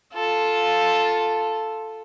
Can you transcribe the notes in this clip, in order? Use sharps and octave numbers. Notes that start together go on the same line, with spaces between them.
F4 A4